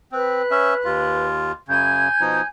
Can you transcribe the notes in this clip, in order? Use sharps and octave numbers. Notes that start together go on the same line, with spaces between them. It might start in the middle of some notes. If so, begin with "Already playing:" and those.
C4 B4 F#6
C#4 E5
D#2 F4
F#2 C#3 G#5 G6 G#6
B2 F3 D#4